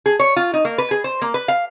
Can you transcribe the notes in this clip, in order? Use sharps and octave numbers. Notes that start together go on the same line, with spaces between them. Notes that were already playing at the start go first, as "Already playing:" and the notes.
G#4
C#5
F4
D#4
A#3
B4
G#4
C5
A#3
B4
F5